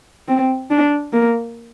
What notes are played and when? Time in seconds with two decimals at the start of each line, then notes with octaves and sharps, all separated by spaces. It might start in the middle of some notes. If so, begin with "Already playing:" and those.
0.28 C4
0.70 D4
1.13 A#3